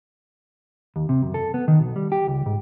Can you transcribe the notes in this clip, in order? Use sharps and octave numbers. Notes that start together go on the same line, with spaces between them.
D#2
C3
F#2
A4
B3
D#3
B1
G3
G4
C#2
G#2